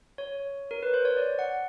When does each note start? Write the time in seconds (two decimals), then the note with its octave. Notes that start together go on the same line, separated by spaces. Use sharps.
0.18 C#5
0.71 A#4
0.83 B4
0.94 C5
1.05 C#5
1.17 D5
1.39 F#5